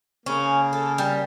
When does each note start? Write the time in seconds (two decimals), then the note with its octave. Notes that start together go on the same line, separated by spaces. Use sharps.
0.26 C#3 A#3 C#4
0.73 A4
0.98 G3